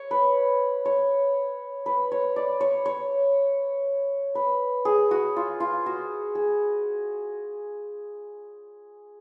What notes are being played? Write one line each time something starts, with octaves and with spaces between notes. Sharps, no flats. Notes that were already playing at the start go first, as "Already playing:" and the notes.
Already playing: C#5
B4
C#5
B4
C#5
D5
C#5
C#5
B4
G#4
F#4
F4
F4
F#4
G#4